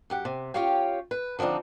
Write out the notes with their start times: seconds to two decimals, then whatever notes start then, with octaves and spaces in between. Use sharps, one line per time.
0.10 F#2 G4 F#5
0.25 C3
0.54 C#4 F4 G4 C#5 F5 G5
1.11 B4
1.39 D3 F3 C4 D4 D#4